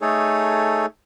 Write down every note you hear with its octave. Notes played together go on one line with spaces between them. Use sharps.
A3 D#4 G#4 A4 C#5